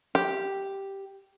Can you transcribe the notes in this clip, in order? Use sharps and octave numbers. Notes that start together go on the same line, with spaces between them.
G4